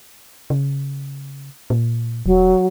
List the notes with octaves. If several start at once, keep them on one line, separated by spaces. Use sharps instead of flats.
C#3
A#2
E1 F#3